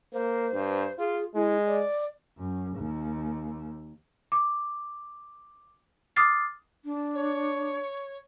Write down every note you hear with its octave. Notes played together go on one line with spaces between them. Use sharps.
A#3 C5
G2
F4 G#4
G#3 E4
D5
F#2
D#2
D6
D6 D#6 F6 A6 C7
D4
C#5